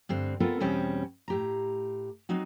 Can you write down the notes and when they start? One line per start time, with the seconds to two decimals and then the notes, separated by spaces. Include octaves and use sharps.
0.09 G2 D3 C4
0.40 B3 C4 F4 A4 A#4
0.60 E2 B2 G3 C4 C#4 G5
1.28 A2 G4 A#5
2.29 F#3 C4 D#4 F#4